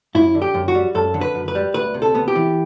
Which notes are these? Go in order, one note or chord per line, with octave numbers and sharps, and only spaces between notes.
F#2 E4
D3
G4
F#2
F#4
G3
F#2 A4
D3
B4
F#2
B4
G3
D2 B4
C3
A4
B3
G4
E3